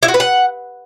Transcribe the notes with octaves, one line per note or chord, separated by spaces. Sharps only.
E4
F#4
B4
F#5